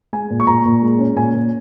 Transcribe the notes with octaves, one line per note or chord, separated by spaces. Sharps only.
G#3 G#5
A#2
C#6
A#2 A#5
A#2
G#3
C#4
A#2 G#5
A#2